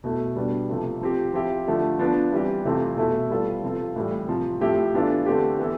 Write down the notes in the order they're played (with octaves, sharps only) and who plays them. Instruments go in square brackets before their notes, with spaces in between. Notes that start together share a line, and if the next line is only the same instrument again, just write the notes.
[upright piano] B2 A3 E4
B2 G3 B3 D4
C3 F3 A3
F3 C4 G4
F3 C4 E4 G4
D3 F3 A3 E4
F3 B3 D4
E3 G3 C4 G4
C3 E3 A3 C4 F4
B2 A3 E4 A4
G3 B3 F4 A4
C3 F3 C4 F4 A4
A2 E3 G3
C3 F3 C4
A2 F3 C4 E4 G4
E3 B3 D4 F4 A4
D3 A3 C4 G4
E3 B3 E4 A4